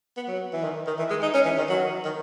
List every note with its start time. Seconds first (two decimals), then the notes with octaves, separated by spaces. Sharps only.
0.17 B3
0.28 F#3
0.53 E3
0.64 D#3
0.87 D#3
0.98 E3
1.10 G#3
1.22 D#4
1.34 C#4
1.45 E3
1.58 D#3
1.69 F#3
2.05 D#3